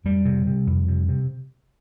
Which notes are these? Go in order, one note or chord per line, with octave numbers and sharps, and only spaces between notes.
F2 G3
C3
C3
F2
C3
C3